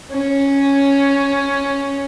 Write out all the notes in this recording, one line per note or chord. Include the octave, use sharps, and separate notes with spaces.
C#4